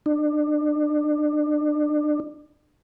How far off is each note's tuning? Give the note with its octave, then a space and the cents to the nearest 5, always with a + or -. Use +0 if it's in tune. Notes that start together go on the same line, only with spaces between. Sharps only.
D4 +30